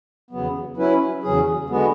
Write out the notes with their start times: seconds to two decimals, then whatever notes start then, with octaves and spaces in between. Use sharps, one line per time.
0.31 E2 C#3 F#3 B3
0.77 F#3 C#4 E4 B4
1.23 E2 C#3 F#3 C#4 G#4
1.70 D3 G#3 B3 F#4